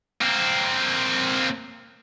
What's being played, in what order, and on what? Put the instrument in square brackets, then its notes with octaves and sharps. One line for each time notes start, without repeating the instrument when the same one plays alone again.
[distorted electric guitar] A#3 C4